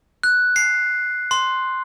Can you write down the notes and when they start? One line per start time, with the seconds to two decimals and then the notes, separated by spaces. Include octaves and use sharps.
0.23 F#6
0.56 C7
1.31 C6